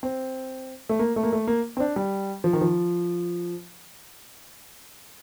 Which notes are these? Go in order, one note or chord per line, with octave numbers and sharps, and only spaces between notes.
C4
A3
A#3
A3
A#3
A3
A#3
C4
D4
G3
F3
D#3
F3